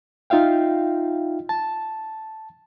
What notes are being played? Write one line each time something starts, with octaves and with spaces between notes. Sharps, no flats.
D#4 F4 E5 F5 G5
A5